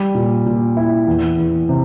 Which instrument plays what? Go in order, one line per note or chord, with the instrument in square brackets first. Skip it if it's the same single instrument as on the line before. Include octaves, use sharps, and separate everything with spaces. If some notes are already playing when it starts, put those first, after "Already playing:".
Already playing: [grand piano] G3
A#2
A#2
E4
E2
E2
C3